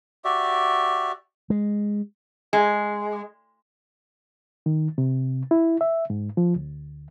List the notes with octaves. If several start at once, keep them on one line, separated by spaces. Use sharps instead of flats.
F#4 G4 D5 E5
G#3
G#3
D#3
C3
E4
E5
G#2
F3
D2